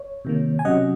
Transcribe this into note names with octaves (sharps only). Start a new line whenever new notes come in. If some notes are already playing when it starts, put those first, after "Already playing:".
Already playing: C#5
C3 D#3 A#3
G#5
C3 F#3 C#4 D#5 F#5